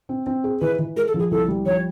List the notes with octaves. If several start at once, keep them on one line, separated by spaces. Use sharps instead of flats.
C4
C4
G#4
E3 B4
E3
G#3 A#4
A4
F3 G#4
C2 A4
G3
F3 C#5